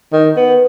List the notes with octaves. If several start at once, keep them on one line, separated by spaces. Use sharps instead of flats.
D#3
B3